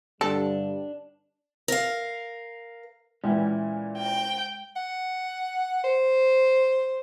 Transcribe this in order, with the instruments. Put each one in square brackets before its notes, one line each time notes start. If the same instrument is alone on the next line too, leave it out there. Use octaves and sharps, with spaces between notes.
[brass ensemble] G2 D3 G3 [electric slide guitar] D4 [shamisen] A4
[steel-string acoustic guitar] A#4 F5
[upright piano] A#2 E3 [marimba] G#3 [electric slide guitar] C#4 E4
[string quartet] G5
[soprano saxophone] F#5
C5